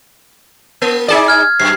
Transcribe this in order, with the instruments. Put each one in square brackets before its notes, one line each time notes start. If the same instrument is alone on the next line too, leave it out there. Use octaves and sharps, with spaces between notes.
[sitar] A#3
D#4 G#4 D5
[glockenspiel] F6 G#6
[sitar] F#2 [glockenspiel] C7